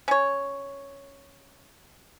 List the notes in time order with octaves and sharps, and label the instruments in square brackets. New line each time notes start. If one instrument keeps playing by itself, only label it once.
[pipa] C#4 C#5